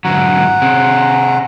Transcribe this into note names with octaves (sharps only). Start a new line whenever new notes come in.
G#2 D3 F#3 F#5 A#5
C3 C4 G#4